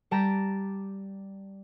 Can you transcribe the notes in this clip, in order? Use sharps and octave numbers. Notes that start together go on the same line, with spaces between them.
G3 G4 A5 A#5 D7